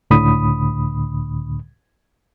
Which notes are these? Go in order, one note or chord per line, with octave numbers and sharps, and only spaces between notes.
C#2 A2 D3 B5 D#6